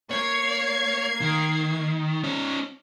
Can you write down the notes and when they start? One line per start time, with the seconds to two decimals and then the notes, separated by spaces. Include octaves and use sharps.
0.11 A#3 C#5 G#6 C7
1.21 D#3
2.24 C#4 D#4